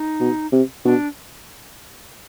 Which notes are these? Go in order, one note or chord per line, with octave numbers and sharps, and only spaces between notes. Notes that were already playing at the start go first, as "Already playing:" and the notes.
Already playing: D#4
B2
C3
B2 D4